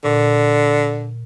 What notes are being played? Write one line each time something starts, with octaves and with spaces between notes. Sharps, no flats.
A#2 D3